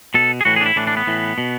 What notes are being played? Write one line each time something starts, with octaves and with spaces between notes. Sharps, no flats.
B2 A4
G#4
A2 E3 F#4
G#4
D4
E4
A2 E3 D4
D4
B3
A2 E3
B2